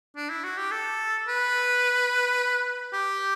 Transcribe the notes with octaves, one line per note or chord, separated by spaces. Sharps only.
D4
E4
F#4
G4
A4
B4
G4